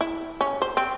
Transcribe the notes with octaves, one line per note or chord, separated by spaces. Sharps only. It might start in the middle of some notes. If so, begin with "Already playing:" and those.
E4
C#4
C5
C4